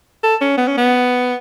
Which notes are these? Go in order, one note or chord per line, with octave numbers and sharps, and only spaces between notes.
A4
C#4
B3
C#4
B3